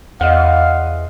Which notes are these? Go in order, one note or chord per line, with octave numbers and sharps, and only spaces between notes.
E2 C5 D#5 F5 F#5